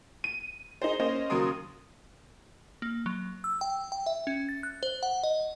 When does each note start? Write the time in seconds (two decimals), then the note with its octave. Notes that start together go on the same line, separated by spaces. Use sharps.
0.24 D#7
0.82 D#4 G#4 C5
1.00 A#3 C#4 C5 D#5
1.30 D#2 C#3 F#3 A#4 C6 D#6
2.82 A#3
3.06 F#3
3.44 E6
3.61 G5
3.92 G5
4.06 E5
4.27 C#4
4.49 A6
4.63 F#6
4.83 C5
5.03 F#5
5.23 D#5